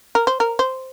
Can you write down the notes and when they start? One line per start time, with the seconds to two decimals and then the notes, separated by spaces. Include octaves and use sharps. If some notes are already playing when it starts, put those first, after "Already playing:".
0.15 A#4
0.27 C5
0.40 A#4
0.59 C5